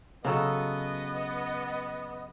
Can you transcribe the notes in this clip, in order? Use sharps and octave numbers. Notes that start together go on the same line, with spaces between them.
C#3 F#3 B3 A4 D#5